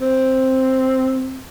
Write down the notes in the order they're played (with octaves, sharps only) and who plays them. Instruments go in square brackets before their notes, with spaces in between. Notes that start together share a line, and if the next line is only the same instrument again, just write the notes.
[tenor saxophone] C4